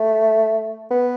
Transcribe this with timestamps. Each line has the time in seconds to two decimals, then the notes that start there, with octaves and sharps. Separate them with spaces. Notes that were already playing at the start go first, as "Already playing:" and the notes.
Already playing: A3
0.91 B3